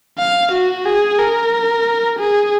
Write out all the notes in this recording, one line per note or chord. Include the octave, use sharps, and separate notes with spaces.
F5
F#4
G#4
A#4
G#4